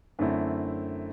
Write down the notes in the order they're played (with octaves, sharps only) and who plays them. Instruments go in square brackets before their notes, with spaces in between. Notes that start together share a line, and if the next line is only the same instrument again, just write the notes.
[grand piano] F#2 D3 A3 C4 E4